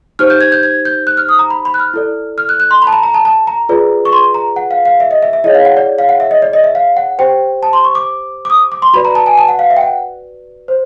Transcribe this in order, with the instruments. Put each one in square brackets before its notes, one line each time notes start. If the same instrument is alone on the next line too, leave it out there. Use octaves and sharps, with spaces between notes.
[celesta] D#4 G4 C5 F6
G6
G#6
G6
G#6
G6
F#6
F6
D#6
A#5
B5
B5
F#6
F6
E4 A4 D5
F6
F#6
F#6
C6
B5
A5
A#5
A#5
A5
A5
A#5
F4 G#4 B4 D5
C#6
C6
A#5
F#5
F5
F5
E5
D#5
E5
E5
E4 G#4 C#5 D#5
F5
F#5
D5
F5
F#5
E5
D#5
D5
D#5
E5
F5
F#5
G4 C5 G5
A5
C6
C#6
D6
D6
D#6
D6
C6
F#4 B4 D5 B5
A#5
A5
G#5
A5
F#5
F5
E5
G5
F#5
C5